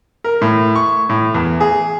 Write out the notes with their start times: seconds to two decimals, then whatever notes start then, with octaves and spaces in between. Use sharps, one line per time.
0.24 A#4
0.41 A2
0.76 C#6
1.09 A2
1.34 E2
1.60 G#4